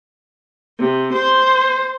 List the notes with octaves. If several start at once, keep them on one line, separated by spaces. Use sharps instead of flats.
C3
C5